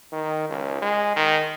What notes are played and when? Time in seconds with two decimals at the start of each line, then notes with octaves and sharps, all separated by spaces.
0.12 D#3
0.49 C#2
0.82 G#3
1.16 D#3